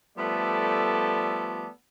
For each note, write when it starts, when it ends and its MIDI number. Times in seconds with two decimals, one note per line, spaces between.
0.18 1.65 53
0.18 1.65 55
0.18 1.65 57
0.18 1.65 59
0.18 1.65 69
0.18 1.65 74